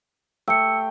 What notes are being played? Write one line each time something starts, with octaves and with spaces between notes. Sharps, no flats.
A3 G5 E6 C#7